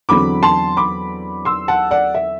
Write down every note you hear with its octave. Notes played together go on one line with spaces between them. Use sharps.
E2 D3 F#3 C4 B5 D6
A5 C6
B5 D6
C6 E6
F#5 A5
D5 F#5
E5